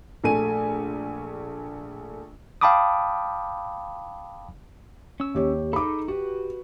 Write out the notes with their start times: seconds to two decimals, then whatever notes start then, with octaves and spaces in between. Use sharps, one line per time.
0.24 A#1 A3 G#5 D#7
2.61 F5 G5 A5 B5 D6 D#6
5.20 C#4 E6
5.34 D#2 G4 C#5
5.73 D#4 G#4 A4 B5 D6
6.08 F#4 G4 B4